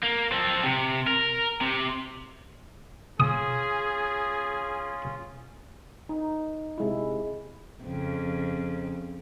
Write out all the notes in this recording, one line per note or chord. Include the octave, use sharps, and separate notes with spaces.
A#3
C4 A4
C3
A#4
C3
C#4 F4 G#4 D#6
D#4
C3 G#3 E4
F2 C#3